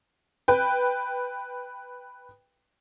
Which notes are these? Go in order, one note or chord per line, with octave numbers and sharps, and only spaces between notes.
B4 G5